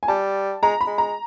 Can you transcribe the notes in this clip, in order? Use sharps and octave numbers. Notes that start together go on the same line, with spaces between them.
G#5
G3 A5
G#3 A#5
B5
G#3
A#5